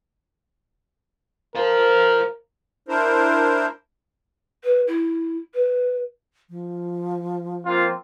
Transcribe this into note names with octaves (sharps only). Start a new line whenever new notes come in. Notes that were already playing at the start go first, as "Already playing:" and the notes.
A#4 C5 F5
D4 E4 A#4 C5
B4
E4
B4
F3
A#3 C4 F4